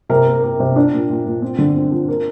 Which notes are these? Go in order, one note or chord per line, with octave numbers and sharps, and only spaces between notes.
C3 A#4
A#3
A#3
C3
D4
A#2
A#2
A#2
C4
D3
C4
F3
A#3